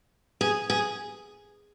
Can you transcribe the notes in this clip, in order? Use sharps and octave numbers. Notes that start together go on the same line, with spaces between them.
G#4
G#4